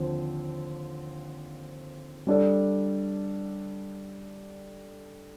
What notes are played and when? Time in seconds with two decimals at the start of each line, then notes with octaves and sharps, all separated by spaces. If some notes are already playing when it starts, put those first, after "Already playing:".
Already playing: D#2 D3 F3 C4
2.27 G3 D4 A4 D5